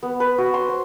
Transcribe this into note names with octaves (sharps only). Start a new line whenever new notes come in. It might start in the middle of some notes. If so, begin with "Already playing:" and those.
B3
B4
F#4
C6
C5